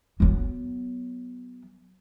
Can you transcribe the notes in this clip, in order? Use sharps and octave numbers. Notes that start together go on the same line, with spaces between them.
F#3 B3